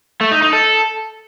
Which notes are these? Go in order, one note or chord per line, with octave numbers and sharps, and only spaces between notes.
A3
D#4
D#4
A4